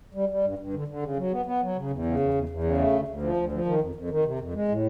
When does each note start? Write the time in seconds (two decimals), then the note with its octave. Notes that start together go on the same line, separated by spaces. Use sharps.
0.14 G3
0.29 G3
0.44 G2
0.59 G2
0.74 D3
0.88 D3
1.02 C#3
1.17 F#3
1.31 B3
1.46 B3
1.62 F#3
1.76 C#3
1.91 E2
2.05 C#3
2.19 E2
2.34 E2
2.49 E2
2.64 C#3
2.78 A3
2.92 D2
3.08 D2
3.22 F3
3.37 D2
3.52 F3
3.66 D#3
3.81 F2
3.95 F2
4.10 D#3
4.25 C3
4.39 F2
4.54 G#3
4.68 A2